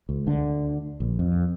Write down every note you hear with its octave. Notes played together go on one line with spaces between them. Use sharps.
C#2
D2 D3
A#1
F2